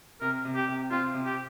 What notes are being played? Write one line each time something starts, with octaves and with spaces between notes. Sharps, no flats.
C3 A#4
C3
G4
C3
C4 F4
C3
G4